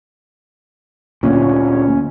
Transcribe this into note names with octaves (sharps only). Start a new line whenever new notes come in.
D2 A#2 C#4